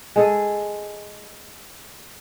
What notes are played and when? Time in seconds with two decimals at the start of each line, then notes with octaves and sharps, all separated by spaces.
0.16 G#3 G#4 A4